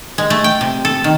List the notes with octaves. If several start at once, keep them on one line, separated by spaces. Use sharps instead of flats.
G#3
A3
G5
C3
A4
D#3